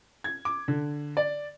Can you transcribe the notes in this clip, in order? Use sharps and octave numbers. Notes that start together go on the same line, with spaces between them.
G#6
D6
D3
D5